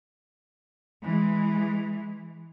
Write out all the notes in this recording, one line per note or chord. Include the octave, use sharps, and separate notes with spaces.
E3 G#3